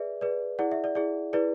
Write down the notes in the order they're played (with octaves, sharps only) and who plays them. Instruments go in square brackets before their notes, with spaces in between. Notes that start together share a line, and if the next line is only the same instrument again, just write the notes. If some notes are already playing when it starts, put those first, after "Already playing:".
Already playing: [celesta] G#4 B4 D5 E5
G#4 B4 D5
E4 G#4 D5 F#5
E5
D5
E4 G#4 D5
E4 G#4 B4 D5